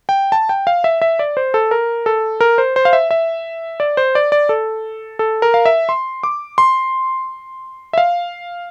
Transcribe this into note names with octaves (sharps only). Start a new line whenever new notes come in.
G5
A5
G5
F5
E5
E5
D5
C5
A4
A#4
A4
A#4
C5
C5
F5
E5
E5
D5
C5
D5
D5
A4
A4
A#4
F5
E5
C6
D6
C6
E5
F5